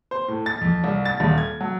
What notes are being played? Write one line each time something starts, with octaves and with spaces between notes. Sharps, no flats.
C5
A2
A6
F2
C2
A6
D#1
G#6
F#3